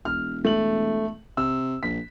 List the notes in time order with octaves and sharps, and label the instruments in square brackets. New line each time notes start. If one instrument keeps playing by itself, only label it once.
[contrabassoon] E1 [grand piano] F6
[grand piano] A3 F#7
[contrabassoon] C3 [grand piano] E6
[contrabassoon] A#1 [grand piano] B6